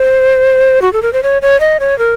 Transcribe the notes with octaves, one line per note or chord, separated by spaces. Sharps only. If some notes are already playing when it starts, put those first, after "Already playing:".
Already playing: C5
F#4
A4
A#4
C5
C#5
C#5
D#5
C#5
A#4